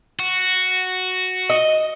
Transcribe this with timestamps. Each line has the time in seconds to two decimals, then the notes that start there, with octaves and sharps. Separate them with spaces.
0.19 F#4
1.50 D#5